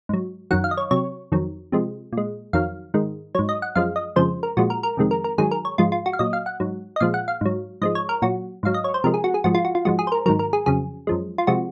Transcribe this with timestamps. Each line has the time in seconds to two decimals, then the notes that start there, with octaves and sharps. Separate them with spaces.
0.09 G#2 F#3
0.51 F#2 D#3 F#3 F#5
0.64 F5
0.71 D#5
0.77 C#5
0.91 C3 F#3 C#5
1.32 F2 D#3 F#3
1.72 C3 F3 G#3
2.13 A#2 G#3
2.53 F2 D#3 F#3 F5
2.94 G#2 D#3 G#3
3.35 G#2 F#3 C#5
3.49 D#5
3.62 F#5
3.75 F#2 F3 G#3 F5
3.96 D#5
4.16 F2 C#3 F3 G#3 C5
4.43 A#4
4.57 A#2 F3 G#3 F#4
4.70 A#4
4.83 A#4
4.97 F2 C3 D#3 G#3
5.11 A#4
5.24 A#4
5.38 G#2 D#3 F#3 G#4
5.51 A#4
5.65 C#5
5.78 G#2 F3 G#3 F4
5.92 F4
6.06 F#4
6.13 F5
6.19 A#2 F#3 D#5
6.33 F5
6.46 F#5
6.60 G#2 F#3
6.96 D#5
7.00 A#2 F3 G#3 F5
7.14 F#5
7.28 F5
7.41 G#2 F#3
7.82 G#2 F3 G#3 D#5
7.95 C#5
8.09 A#4
8.22 A#2 F#3 F#4
8.63 G#2 F#3 F5
8.74 D#5
8.84 C#5
8.94 C5
9.04 C3 F3 G#3 A#4
9.14 G#4
9.24 F#4
9.34 G#4
9.44 G#2 F3 G#3 F#4
9.55 F4
9.65 F#4
9.75 F4
9.85 G#2 F3 G#3 F#4
9.99 G#4
10.07 C5
10.12 A#4
10.26 G#2 D#3 F#3 A#4
10.39 A#4
10.53 G#4
10.66 F2 C#3 F#3 G#4
11.07 F#2 F3 G#3
11.38 F4
11.47 C3 F3 G#3 F#4